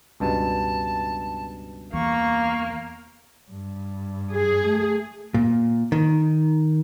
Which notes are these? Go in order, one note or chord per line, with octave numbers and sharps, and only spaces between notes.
C#2 G2 B2 A5
E2 A#3 C#6
G2
G#4
A3
A#2
D#3